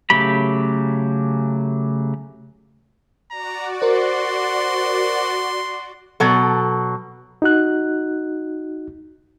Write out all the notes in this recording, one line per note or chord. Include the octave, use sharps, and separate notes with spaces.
C#3 F#3 A3 G4 B5
F#4 D5 A#5
A#4 C5 C6
B2 F#3 A4
D#4 F#4 F#6